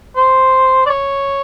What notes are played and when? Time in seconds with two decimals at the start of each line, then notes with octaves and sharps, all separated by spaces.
0.16 C5
0.86 D5
0.90 C#5